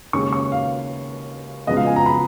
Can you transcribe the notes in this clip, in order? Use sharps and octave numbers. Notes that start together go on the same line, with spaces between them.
D#2 C#3 G#3 C#4 C#6
C#6
F5
C#2 C#3 F3 G#3 B3 D#5
F5
G#5
A#5
B5